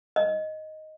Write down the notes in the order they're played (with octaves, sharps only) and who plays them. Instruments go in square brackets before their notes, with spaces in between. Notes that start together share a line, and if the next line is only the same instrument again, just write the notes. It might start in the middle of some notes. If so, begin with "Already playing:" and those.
[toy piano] D#5